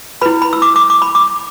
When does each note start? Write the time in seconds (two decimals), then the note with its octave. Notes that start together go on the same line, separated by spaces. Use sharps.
0.22 E4 B4 B5
0.42 B5
0.53 E6
0.62 D6
0.76 D6
0.90 D6
1.02 B5
1.15 D6